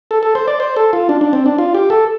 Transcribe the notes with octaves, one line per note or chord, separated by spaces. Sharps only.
A4
A4
C5
D5
C5
A4
F4
D4
D4
C4
D4
F4
G4
A4